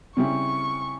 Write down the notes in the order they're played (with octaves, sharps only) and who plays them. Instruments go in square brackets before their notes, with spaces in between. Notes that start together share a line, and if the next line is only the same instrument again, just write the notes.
[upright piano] C#3 G3 C4 E4 [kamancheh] C#6